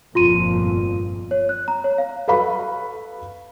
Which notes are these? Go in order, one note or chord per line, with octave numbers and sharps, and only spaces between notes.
G1 F2 A#2 F4 C6 D#7
C#5
F#6
A#5
C#5
F5
A4 B4 F5 B5 C#6